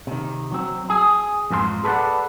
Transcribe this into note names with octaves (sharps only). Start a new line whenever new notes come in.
C3 D#3
F#3 C4
G#4
F2 G#2 A#3 G4 C6
G#4 A4 B4 C5 D5 F#5